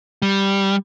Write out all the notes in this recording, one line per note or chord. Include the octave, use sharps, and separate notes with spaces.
G3